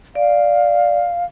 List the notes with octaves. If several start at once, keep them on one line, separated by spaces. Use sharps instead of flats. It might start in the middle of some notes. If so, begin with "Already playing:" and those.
D5 F5